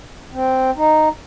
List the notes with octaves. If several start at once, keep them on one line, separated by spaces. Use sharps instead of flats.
C4
D#4